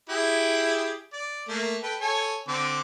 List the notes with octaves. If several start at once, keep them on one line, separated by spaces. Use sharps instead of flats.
E4 G4 G#4
D5
A3 A#3
A4 B4 G5
A4 C#5 G#5
D3 C4 D6